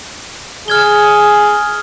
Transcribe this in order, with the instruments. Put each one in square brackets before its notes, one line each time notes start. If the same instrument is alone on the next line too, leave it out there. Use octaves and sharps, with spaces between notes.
[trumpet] G#4 [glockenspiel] F6 G#6 G7